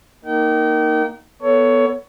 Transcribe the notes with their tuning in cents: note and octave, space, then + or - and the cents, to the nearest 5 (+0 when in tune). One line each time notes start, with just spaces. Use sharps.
A#3 +0 D#4 +0 G5 -35
B3 +0 A4 +15 C#5 +15